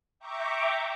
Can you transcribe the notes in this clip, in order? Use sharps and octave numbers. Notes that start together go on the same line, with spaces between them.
E5 G5 A#5 C#6 D6